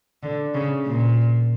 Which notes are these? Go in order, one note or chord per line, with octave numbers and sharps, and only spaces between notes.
D3
C#3
A#2